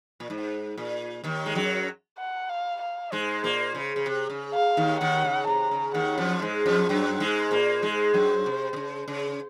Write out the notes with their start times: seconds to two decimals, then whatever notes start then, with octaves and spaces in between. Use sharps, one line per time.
0.20 A#2
0.30 G#2
0.77 A#2
1.24 D#2 D#3
1.46 G#3
1.55 F#2 F#3
2.18 F#5
2.49 F5
2.81 F5
3.12 G#2 G#3 C5
3.44 A#2 A#3
3.75 C#3
3.96 C#3
4.06 C3
4.30 C#3
4.54 F5
4.77 D#2 D#3
5.00 D#2 D#3 F#5
5.24 C#3
5.47 C3 A#5
5.71 C#3
5.94 D#2 D#3 F#5
6.18 F2 F3
6.42 G#2 G#3 C5
6.66 F2 F3
6.89 F#2 F#3 C5
7.20 G#2 G#3
7.51 A#2 A#3
7.82 G#2 G#3
8.14 F#2 F#3
8.46 C3
8.73 C3
8.76 C#3
9.08 C#3